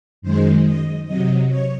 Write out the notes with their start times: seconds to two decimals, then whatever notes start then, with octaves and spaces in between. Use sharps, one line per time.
0.22 F#2 D#3 G#3 C5
0.64 D#5
1.06 C3 F#3 D#5
1.49 C#5